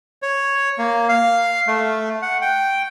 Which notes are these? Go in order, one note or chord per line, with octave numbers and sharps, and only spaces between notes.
C#5
A#3
F5
A3
F#5
G5